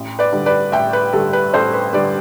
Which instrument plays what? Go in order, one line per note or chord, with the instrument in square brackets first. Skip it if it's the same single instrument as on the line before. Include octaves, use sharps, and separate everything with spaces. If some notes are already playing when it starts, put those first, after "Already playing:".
Already playing: [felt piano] A1
B4 D5
G2 D3 G3
B4 D5
A1 E5 G5
B4
G2 D3 G3 A4
B4
A1 A4 C5
B4
G2 D3 G3 B4 D5